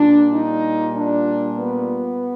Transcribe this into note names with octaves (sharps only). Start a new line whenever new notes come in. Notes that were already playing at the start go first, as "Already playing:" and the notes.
Already playing: A#2 G3 D4
D#4
D4
B3